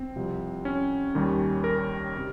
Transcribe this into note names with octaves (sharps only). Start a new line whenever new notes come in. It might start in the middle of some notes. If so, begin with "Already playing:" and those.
Already playing: C4
C2 C3 F3
C#4
D#2 D#3 G3
A#4
C3